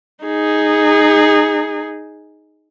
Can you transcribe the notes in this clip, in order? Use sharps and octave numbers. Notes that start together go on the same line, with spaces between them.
D#4 G#4